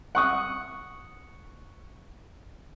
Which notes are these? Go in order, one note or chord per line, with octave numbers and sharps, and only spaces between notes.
F#5 C#6 D#6